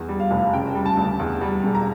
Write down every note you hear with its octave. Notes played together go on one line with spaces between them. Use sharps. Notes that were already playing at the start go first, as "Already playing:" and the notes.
Already playing: E2
G3
F5
F1
C#3 G5
G3
A5
D2
E2
G3
E1
A#5